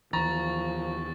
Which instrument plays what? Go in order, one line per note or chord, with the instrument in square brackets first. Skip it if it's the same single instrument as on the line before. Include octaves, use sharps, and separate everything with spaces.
[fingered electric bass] D#2 E3 [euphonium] F3 [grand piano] A#5 [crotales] C#6 A6